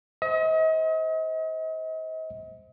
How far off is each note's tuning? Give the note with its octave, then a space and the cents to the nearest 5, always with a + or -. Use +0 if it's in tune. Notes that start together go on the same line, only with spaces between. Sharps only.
C5 +0 D#5 +40